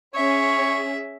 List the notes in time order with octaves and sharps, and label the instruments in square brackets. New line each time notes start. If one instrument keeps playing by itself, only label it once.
[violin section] C#4 G#4 [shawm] C#5 [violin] E5